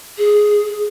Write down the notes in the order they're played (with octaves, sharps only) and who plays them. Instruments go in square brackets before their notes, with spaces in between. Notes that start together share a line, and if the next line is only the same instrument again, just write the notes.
[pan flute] G#4